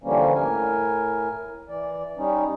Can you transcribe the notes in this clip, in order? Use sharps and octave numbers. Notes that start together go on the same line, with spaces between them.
D3 E3 F3 G3 A#3 C#4
A2 A#4 G#5
E3 D5
G3 C#4 D#4